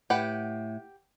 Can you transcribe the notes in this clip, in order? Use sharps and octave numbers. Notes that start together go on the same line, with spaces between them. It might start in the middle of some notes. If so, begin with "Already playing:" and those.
A2 G4 B4 F#5